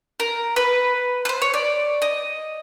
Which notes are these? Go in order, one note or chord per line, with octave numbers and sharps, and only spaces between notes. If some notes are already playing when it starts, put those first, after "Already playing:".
A#4
B4
B4
C5
C#5
D5
D#5